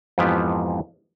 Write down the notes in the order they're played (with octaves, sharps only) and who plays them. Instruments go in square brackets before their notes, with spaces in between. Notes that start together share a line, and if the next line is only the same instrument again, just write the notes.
[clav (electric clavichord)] F2 G#2 E3 F3 B3 G4